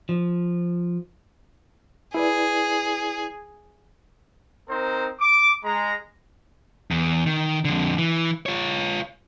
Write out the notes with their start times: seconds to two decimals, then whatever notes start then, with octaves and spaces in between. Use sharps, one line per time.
0.09 F3
2.15 E4 G#4 B4 D5
4.68 C4 D#4 A#4 C5
5.20 D6
5.64 G#3 A#5
6.91 E2
7.26 D#3
7.65 F2 D3
7.98 E3
8.46 F4 C#5